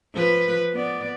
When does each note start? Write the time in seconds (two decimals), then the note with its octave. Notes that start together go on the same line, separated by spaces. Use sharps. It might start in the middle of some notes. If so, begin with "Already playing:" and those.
0.15 F3 B4
0.73 B3 D5